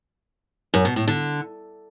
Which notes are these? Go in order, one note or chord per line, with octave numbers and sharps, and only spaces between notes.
F#2
B2
A2
D3